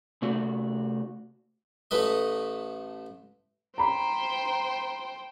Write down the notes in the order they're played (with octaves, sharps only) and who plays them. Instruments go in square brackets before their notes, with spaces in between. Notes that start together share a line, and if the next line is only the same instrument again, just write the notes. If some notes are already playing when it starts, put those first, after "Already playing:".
[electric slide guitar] C3 A3 F#4 D5
[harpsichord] A1 A3 B4 D#5
[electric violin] C5 G5 [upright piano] A#5 B5